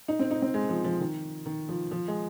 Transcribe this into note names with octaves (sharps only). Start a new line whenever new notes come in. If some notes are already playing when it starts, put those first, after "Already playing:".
D#4
C4
D#4
C4
G#3
F3
F3
D#3
D#3
F3
F3
G#3